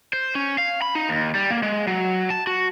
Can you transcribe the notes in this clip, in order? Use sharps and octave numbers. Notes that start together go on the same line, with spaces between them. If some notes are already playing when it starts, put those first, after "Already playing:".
C5
C#4
F5
B5
D#4
D#2
G3
A#3
G#3
F#3
A5
F#4